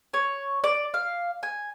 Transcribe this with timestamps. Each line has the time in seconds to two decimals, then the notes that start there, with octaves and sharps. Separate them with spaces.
0.14 C#5
0.64 D5
0.94 F5
1.43 G#5